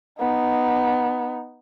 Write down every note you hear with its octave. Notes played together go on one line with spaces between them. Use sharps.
B3 D#4